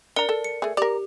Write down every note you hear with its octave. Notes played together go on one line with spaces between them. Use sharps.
D4 A#4 D5 A#5 C#7
A4
C#7
A3 G#4
G4 A#4 D5